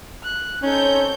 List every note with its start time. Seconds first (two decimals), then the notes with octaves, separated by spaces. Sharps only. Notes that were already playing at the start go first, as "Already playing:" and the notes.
0.23 F#6
0.63 C4 C#4 D#4 A4 C#5 G6